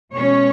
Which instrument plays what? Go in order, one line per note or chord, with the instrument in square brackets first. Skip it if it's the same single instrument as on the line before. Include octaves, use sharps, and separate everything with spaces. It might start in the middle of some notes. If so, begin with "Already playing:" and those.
[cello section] B2 G#3 C#4 C#5